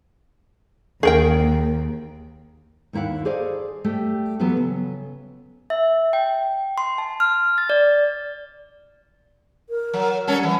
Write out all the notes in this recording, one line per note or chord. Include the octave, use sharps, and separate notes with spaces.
D#2 G#4 A#4 G5
D#2 A#3 E4 F5 F#5
G#4 A4 C5 D5 D#5 F5
G3 A3 G4
E3 F#3 B3 F4 A4 B4
C#3
E5
G5
C6
A5
F6
A6
D5
A#4
F#3
F#3 G3 C#4 A4
E3